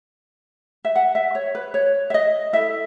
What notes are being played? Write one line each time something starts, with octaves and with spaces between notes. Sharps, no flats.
E5
F#5
E5
C#5
B4
C#5
E5
D#5
E4 A4 E5